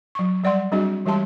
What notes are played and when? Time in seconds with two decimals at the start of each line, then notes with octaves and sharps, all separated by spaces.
0.15 F#3 C#6
0.44 G3 D5 F#5 C6
0.72 G3 C4 D4 F#4 G#4 D#5
1.06 E3 G3 G#3 G4 A5 C6